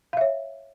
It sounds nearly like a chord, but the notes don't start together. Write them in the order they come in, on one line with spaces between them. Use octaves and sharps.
F5 E5 C#5